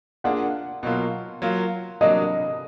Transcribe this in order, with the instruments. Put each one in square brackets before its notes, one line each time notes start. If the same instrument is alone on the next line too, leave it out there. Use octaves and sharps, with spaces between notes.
[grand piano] A#3 D4 F4 G#4 [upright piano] F#5
[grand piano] B2 F#3 A#3 F4
F#3 A#3 F4
[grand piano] F#3 A#3 D4 [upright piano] D#5